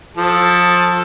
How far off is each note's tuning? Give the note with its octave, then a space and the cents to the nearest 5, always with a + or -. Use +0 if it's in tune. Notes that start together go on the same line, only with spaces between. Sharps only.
F3 +25 A4 +0